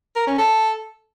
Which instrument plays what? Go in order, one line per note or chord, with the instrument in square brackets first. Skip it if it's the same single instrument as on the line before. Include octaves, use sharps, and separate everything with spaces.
[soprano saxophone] A#4
C#4
A4